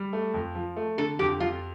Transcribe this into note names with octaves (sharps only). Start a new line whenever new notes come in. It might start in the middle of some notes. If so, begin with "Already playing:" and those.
Already playing: G3
A3
F2
F3
A3
D3 A4
F2 G4
F2 F4